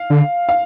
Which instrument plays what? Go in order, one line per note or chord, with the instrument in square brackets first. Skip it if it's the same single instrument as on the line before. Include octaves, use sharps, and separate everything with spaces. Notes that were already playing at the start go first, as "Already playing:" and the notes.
Already playing: [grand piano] F5
[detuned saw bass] D3
[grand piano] F5